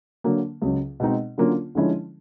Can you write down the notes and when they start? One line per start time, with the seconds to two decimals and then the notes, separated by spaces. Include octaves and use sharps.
0.24 D3 F#3 A#3
0.61 C#2 C#3 F#3
1.00 B2 G#3 C4 D#4
1.38 D3 F#3 A#3 C#4 F4
1.75 D3 F3 G#3 C#4 E4